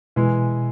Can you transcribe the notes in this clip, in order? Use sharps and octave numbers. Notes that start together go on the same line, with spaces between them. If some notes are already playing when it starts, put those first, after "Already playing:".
B2 E3 G#3